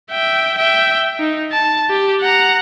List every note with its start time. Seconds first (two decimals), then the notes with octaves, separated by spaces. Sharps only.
0.11 E5 G5
0.58 E5 G5
1.20 D#4
1.52 A5
1.90 G4
2.22 F#5 A#5